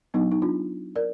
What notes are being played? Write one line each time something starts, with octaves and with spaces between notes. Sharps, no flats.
F#3 B3 D4 D#4
D#4
D4 F4
A#4 D5